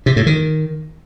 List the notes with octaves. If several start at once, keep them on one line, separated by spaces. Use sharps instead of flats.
C3
A2
D#3